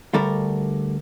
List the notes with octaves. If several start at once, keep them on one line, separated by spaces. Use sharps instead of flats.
D2 G3 A4 A#4